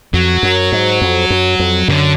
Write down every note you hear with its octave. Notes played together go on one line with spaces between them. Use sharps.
F2 F#3
F#2
G#2
F2
F#2
F2
F#2 D3